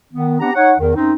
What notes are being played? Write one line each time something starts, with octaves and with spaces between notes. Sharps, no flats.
D#3 B3
B3 C4 D4 G4 F#5 A#5
D#4 C#5 F#5
E2 D#3
F#2 C4 D#4